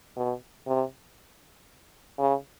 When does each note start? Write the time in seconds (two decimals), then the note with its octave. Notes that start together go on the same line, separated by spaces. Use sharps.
0.17 B2
0.67 C3
2.18 C#3